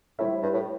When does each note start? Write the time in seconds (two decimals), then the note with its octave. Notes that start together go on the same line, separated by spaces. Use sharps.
0.19 A2 G3 E4 C5 E5
0.42 G2
0.54 A2